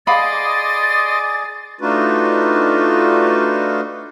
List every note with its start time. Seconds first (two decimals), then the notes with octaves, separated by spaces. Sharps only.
0.07 G#4 D5 D#5 F5 B5 C6 D6 A6
1.81 A3 D4 D#4 F4 F#4 B4